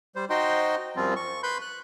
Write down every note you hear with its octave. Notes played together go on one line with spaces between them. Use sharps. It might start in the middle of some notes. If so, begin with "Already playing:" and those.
G3 C5
D#4 F#4 C5 D#5 G5 C6
F#2 F3 G3 C4 F4
C#6
B4 B5 C6 G6
F#6